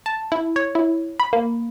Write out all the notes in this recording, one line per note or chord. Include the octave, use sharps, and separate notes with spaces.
A5
E4
C#5
E4
B5
A#3